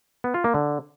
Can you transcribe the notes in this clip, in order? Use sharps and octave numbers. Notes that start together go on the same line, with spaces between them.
B3
F4
A#3
D3